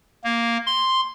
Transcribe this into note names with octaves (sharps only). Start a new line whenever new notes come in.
A#3
C6